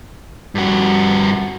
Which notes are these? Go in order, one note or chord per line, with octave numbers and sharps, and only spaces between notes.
G2 F#4